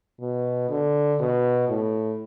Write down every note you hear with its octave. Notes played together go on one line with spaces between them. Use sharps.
B2
D3
B2
A2